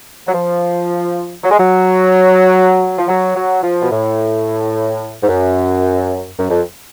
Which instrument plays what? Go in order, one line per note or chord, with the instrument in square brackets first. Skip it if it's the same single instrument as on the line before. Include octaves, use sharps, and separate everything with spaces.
[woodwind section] F#3
F3
F#3
G#3
F#3
F3
F#3
F#3
F3
B2
A2
G#2
F#2
F#2
F2